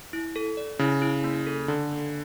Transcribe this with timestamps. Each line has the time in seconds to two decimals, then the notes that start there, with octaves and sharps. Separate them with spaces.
0.13 E4
0.36 A4
0.57 D5
0.79 C#3 E4
1.02 E4
1.24 A#3
1.47 A4
1.68 D3 A#3
1.92 A#3